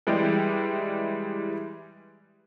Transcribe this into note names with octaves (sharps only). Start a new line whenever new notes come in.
E3 G3 G#3 E4 G4